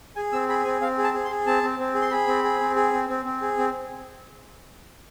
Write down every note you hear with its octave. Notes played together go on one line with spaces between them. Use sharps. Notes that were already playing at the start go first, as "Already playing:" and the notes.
G#4 G#5
C4 E6
G#4 B5
C4 G#5
C4 F5
G#4
A5
G#4
C6
G#4
C4 A5
C4
C4
G#4
C6
G#4 B5
C4
G#4
C4
G#4
C4
C4
C4
G#4
C4